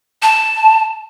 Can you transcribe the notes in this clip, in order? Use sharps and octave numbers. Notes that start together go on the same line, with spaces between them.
A5